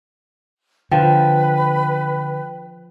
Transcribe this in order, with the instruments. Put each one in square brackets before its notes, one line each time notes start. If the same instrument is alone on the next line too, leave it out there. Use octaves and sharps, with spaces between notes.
[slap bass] D3 [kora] F3 [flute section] B4 [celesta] G5